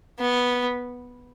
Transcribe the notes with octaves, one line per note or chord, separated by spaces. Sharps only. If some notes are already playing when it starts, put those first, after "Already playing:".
B3